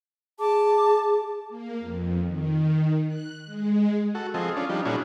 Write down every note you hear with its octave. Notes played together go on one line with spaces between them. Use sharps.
G#4 A5 D6
A#3
F2
D#3
F#6
G#3
F#4 A4
F3 C4 G#4 A4 D#5
C#4 D4 F4
F3 G3 D4 D#4
A#2 C#4 D4 E4 F#4 G#4